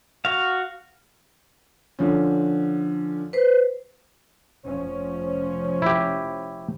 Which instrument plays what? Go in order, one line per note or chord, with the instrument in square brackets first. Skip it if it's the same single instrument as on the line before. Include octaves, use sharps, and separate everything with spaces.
[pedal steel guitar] F#4 F5
[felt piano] D3 F3 C#4
[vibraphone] B4 C5
[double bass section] F1 F3 C#4
[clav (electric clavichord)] E4 G4